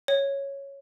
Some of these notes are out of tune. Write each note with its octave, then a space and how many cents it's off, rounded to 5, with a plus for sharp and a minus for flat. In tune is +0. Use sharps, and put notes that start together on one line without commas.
C#5 -5